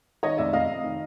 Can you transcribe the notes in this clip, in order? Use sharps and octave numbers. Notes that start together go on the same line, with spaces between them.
D#3 C#5 D#5
F1 D5 E5
F1 D#5 F5
F1
D#3